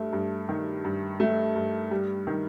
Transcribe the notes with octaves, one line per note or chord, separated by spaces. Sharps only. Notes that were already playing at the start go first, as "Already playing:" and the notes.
Already playing: G2 A3
G2
D#3
G2
A3
G2
G3
D#3